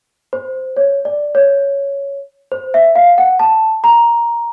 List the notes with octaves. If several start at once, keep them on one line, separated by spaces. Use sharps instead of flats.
C5
C#5
D5
C#5
C5
E5
F5
F#5
A5
A#5